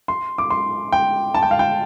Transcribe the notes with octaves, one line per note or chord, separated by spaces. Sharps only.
C6
D6
C6
G5
A5
G5
F5
G5